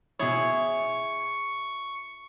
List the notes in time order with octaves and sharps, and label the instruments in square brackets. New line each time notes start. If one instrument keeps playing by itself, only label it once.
[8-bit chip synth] B2 C#5 [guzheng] E4 G#4 [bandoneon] C#6